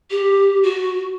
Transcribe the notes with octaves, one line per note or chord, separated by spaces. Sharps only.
G4
F#4